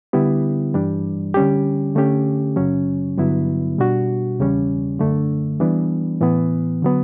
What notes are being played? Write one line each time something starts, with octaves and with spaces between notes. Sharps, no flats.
D3 G3 B3 E4 G4
G2 E3 G3 D4
D3 G3 C#4 G4
D3 A3 C#4 G4
F#2 C#3 F#3 C#4
G2 D3 F#3 B3 E4
B2 G3 D4 F#4
E2 C#3 G3 C#4
F#2 D3 A3 D4
E3 G3 B3 D4
A2 E3 B3
D3 F#3 B3